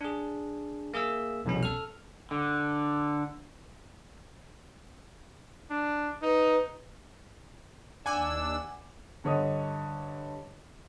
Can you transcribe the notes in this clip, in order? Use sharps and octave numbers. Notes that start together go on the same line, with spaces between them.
D4 G#4
A#3 G#4 E5 E6
C2 F2 B2 C#4
A4 F6
D3
D4
D#4 B4
D#2 D4 D5 F#5 G#5 D6 E6
G2 D3 C#5 D#5 D#6